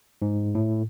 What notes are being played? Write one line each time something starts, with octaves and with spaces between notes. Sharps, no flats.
G#2
A2